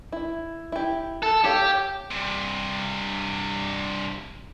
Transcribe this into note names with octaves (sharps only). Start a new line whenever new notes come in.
E4
E4 G4
A4
G4 A4 C#5 F5
G2 C3